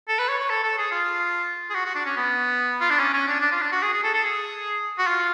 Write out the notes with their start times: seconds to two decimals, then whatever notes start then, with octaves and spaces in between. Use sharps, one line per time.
0.08 A4
0.19 B4
0.29 C#5
0.40 C#5
0.50 A4
0.64 A4
0.78 G#4
0.91 F4
1.70 G#4
1.75 F#4
1.85 F#4
1.95 D4
2.06 C#4
2.16 B3
2.81 F4
2.90 D4
2.99 C#4
3.13 C#4
3.28 D4
3.40 D4
3.52 F4
3.61 D4
3.72 F#4
3.83 G#4
3.93 G#4
4.04 A4
4.14 A4
4.24 G#4
4.99 F#4
5.07 F4